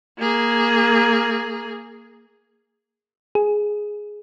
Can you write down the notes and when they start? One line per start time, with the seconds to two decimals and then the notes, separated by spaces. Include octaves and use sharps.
0.18 A#3 G#4
3.35 G#4